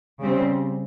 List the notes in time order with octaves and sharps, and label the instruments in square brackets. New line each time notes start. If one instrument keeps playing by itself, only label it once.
[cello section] C#3 G3 C4